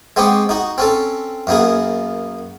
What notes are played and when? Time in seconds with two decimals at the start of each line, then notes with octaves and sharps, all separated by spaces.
0.16 G#3 B3 C4 G4 C#6
0.49 D#4 F#4
0.78 C4 C#4 A4
1.47 F#2 A#3 B3 G#4